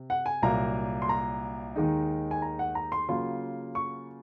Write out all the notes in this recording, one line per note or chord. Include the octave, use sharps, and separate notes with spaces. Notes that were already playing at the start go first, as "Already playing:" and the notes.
Already playing: C3
F#5
G#5
C2 A#2 F#3 A#3 A#5
C6
A#5
D#2 D#3 G#3 D#4
G#5
A#5
F#5
A#5
C6
C#3 F#3 A#3 F4 C6
C#6